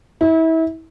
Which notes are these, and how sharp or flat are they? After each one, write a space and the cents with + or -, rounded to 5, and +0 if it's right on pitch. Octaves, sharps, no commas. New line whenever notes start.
E4 -30